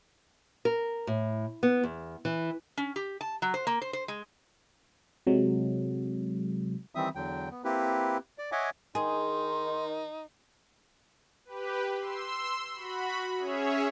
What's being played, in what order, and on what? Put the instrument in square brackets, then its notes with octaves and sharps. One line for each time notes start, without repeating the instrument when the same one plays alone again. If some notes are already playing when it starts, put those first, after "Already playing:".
[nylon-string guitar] A#4
A2
B3
E2
E3
[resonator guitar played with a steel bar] C#4
G4
A5
F#3
C5
A#3
C5
C5
G#3
[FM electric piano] C3 F#3 G#3
[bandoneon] D#3 E3 G3 C4 E5 D#6
E2 D3 F#3 G5
B3
A#3 C4 E4 G4 B4
D5
C#5 D#5 E5 F#5 G#5 D6
[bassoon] D#3 [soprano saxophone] D#4 [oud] G#4 [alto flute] C6
[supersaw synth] G4 B4
C6 E6
F#4 B5
C#4 G#4 C#5 E5